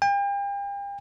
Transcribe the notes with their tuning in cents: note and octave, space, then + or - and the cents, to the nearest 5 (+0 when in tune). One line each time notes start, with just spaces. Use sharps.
G5 +40